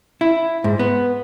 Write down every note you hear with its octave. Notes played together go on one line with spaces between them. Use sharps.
E4
G#2
B3